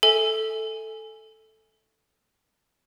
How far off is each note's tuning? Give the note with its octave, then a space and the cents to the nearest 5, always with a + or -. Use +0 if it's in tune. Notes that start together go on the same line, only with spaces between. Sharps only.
A4 +0 E5 -25 G#5 +0